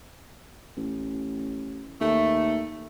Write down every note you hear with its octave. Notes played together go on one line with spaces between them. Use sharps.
A1
D#2 A3